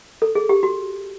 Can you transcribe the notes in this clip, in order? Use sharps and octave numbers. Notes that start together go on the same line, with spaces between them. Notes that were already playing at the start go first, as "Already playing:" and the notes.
A4
G#4
G4
F#4